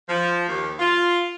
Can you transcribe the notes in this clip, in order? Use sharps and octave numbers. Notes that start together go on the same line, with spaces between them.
F3
D#2
F4